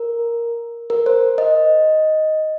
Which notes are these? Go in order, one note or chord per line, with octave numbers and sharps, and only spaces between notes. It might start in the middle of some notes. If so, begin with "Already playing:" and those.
Already playing: A#4
A#4
C5
D#5